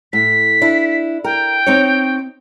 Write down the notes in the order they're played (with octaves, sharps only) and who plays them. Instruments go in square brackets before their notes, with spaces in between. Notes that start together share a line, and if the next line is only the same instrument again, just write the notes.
[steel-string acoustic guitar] A2 [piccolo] B6
[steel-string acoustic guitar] D4 E4
[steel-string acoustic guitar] A#4 [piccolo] G5
[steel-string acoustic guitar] C4 D#4 C#5